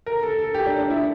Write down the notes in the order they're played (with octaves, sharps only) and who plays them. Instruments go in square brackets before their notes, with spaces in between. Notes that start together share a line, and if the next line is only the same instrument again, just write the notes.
[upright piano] A#4
A4
A4
G4
D4
D4
E4